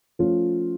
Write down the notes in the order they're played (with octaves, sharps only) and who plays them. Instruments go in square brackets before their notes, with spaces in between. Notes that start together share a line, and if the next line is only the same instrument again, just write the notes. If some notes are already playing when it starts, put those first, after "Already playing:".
[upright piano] F3 A3 C#4 F4